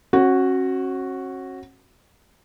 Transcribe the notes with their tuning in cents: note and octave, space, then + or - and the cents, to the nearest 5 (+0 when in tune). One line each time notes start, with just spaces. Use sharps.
C#4 -40 F#4 +0